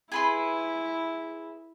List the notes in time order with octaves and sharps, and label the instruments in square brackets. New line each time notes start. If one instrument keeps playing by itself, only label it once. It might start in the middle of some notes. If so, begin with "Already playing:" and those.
[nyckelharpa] E4 [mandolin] G#4 B4 C6